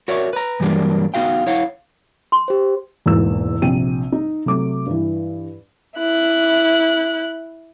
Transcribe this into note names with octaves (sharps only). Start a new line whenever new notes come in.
F#4 A#4 C#5 D5 E5
B4 A#5
G2 E3 F#3 G3 A#3 D4
B3 D#4 F#4 F5 G5
E4 C#5 F5 F#5
C6
G4 C5
E1 E2 G#2 A#3 E6
A#1 C3 G5 D#7
D#4
C3 F#3 A3 D6
G2 E3
E4 F#6